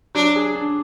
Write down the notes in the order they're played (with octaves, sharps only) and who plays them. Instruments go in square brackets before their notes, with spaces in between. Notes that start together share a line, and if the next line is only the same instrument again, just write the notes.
[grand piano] F#3 [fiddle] D4
[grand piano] G#4
D4